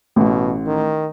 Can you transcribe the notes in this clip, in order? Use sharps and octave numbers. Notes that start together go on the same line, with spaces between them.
A1 B2
D#3